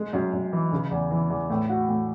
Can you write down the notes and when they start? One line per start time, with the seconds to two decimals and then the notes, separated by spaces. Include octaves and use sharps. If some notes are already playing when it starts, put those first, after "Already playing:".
Already playing: G#3
0.13 F#2
0.33 F#2
0.53 E3
0.72 C#3
0.91 E2
1.11 E3
1.30 E2
1.50 A2
1.69 F#4
1.89 A2